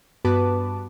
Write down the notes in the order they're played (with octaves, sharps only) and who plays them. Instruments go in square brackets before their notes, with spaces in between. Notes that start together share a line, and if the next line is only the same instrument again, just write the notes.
[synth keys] G2 B3 F#4 B4 A5 D6